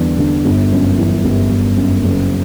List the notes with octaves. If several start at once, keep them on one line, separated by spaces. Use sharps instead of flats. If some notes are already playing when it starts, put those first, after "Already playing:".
Already playing: E2 D3 G3 D4
D3
G1
F#2
E3
G1
G1
F#2
F#1